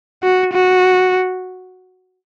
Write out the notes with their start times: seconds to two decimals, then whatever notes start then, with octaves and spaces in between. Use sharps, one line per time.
0.23 F#4
0.53 F#4